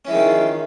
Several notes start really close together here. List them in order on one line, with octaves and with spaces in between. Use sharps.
C#4 E3 G#3 D#3 F4